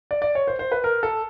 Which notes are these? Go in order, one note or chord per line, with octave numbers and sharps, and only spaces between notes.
D5
D5
C#5
C5
C5
B4
A#4
A4